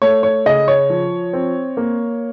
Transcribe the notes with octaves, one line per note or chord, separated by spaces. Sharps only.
A3 C#5
C#5
C#3 D#5
C#5
F3
C4
A#3